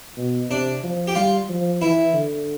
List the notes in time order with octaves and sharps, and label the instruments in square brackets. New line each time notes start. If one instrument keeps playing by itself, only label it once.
[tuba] B2
[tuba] C3 [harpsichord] D4
[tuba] F3
[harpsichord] G4
[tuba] G3 [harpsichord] F4
[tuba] F3
[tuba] E3 [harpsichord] E4
[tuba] D3